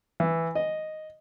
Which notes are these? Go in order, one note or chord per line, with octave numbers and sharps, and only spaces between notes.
E3
D#5